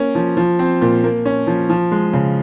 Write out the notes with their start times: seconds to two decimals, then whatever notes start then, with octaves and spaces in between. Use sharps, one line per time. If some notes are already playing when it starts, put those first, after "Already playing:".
Already playing: A#3 C#4
0.15 F3
0.37 F3
0.59 C4
0.81 A#2
1.04 A#3
1.26 C#4
1.47 F3
1.70 F3
1.92 G#3
2.13 C#3